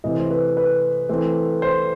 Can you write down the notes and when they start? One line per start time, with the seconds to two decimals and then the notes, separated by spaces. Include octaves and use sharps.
0.04 C3 E3 A3 D#5
0.17 C5
0.31 B4
0.57 B4
1.09 E3 A3 C4
1.62 C5